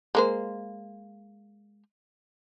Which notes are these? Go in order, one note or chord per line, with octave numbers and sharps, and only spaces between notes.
G#3 A#3 C5